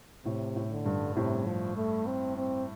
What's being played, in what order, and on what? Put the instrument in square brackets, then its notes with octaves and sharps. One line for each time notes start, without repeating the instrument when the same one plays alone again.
[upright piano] A2 [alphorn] C3
[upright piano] A2
[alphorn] D3
[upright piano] G2
[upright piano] A2 [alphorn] C3
[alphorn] F3
A3
C4
C4